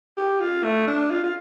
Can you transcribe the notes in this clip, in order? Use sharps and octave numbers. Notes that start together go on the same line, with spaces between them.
G4
F4
A3
D4
F4
F4